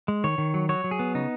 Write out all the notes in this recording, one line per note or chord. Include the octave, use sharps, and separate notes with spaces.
G#3
D#3 C#5
D#3
F#3
F#3 C#5
F#3
G#4
B3
C#3 D#4